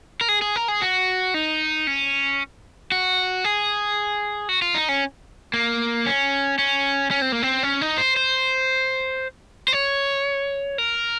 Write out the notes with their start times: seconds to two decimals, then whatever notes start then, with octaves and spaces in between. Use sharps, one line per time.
0.21 A#4
0.29 G#4
0.42 G#4
0.56 A#4
0.68 G#4
0.82 F#4
1.34 D#4
1.87 C#4
2.92 F#4
3.44 G#4
4.49 F#4
4.62 F4
4.75 D#4
4.89 C#4
5.54 A#3
6.06 C#4
6.59 C#4
7.11 C#4
7.22 C4
7.32 A#3
7.43 C4
7.63 C#4
7.81 D#4
7.98 C5
8.16 C5
9.68 C5
9.73 C#5
10.78 A#4